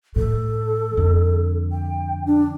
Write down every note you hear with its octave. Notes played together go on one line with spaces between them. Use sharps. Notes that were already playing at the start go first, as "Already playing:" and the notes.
A2 A4
F2 D3
G5
D4